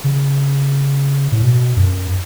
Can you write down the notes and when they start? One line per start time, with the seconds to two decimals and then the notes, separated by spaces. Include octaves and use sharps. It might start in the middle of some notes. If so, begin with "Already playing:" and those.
0.04 C#3
1.32 A2
1.42 B2
1.76 F#2